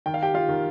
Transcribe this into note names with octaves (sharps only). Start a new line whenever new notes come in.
D#3 G5
F5
G4 G5
F4 F5
D#3